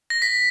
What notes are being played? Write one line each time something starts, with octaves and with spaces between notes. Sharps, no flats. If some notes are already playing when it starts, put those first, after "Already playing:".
A#6
B6